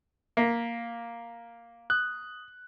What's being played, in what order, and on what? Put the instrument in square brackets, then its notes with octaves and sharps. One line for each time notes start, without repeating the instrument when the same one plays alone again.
[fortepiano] A#3 [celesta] F5 A#6 B6
[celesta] D#6 [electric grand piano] F#6